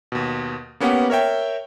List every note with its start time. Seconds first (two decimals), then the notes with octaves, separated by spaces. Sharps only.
0.12 D#2 B2
0.80 A#3 B3 C#4 G4 B4 F#5
1.10 A#4 C#5 E5 G5